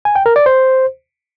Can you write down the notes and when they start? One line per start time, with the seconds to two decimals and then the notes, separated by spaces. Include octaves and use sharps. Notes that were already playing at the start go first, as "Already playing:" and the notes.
0.05 G#5
0.15 G5
0.26 A#4
0.36 D5
0.46 C5